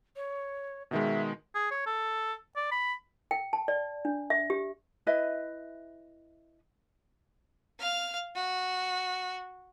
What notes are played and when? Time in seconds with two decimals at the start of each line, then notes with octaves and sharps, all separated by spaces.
0.16 C#5
0.91 B2 D#3 G#3 E5
1.55 G#4
1.71 C#5
1.86 A4
2.56 D5
2.72 B5
3.31 G5
3.53 A5
3.68 D5
4.05 D4
4.30 E5
4.50 G4
5.07 E4 B4 D#5 E5
7.79 F5 F6
8.35 F#4